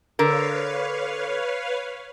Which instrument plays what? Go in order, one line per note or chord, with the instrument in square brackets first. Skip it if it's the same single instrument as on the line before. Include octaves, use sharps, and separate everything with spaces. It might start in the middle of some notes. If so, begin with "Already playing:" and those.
[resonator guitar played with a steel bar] D3 A#4 [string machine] B4 C#5 F5